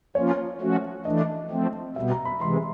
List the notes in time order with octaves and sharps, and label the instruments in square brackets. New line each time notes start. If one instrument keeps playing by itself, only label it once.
[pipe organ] F3 A#3 C#4 F4 [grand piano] C#5
[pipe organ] F3 A3 C#4 F#4
[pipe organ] E3 A3 D4 [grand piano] D#5
[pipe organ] F3 A3 C4
[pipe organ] B2 G3 B3 [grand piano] E5
[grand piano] A#5
B5
[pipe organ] C3 E3 G#3 [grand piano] C6